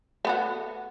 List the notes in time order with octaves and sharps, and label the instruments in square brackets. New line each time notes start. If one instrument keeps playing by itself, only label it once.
[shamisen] A3 B3 F#4